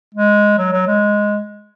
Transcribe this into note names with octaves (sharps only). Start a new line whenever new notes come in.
G#3
F#3
F#3
G#3